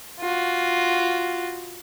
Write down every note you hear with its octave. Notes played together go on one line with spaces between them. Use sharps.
F4 F#4